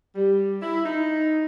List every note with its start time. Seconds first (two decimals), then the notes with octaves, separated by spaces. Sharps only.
0.15 G3
0.62 E4
0.86 D#4